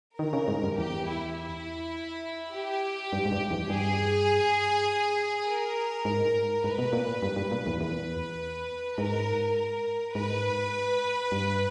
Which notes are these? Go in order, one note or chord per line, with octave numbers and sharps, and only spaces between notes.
D#3 A#4
C#3
G#2
G2
E2 G4
E4
E4
G4
G2
G#2
G2
E2
G2 G#4
A#4
G#2
G#2 B4
B2
A#2
G2
G2
A#2
E2
E2 B4
G#2 A#4
A#4
G#2 B4
G2